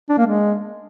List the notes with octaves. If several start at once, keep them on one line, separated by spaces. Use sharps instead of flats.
D4
A#3
G#3